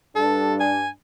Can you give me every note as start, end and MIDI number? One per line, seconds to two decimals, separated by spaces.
0.15 0.87 43
0.15 0.87 62
0.15 0.55 69
0.60 0.89 80